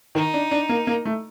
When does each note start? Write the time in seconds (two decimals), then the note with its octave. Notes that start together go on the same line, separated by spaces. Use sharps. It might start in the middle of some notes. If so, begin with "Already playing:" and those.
0.15 D#3 D#4
0.34 D4
0.51 D4
0.69 A#3
0.87 A#3
1.05 A3